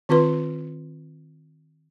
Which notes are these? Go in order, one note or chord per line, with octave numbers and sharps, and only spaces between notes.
D#3 C4 F4 B4 C6